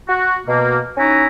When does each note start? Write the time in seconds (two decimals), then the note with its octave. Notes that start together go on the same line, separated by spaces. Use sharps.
0.07 F#4
0.46 B2 A#3
0.97 C#4 D#4 E4 F#4 A#5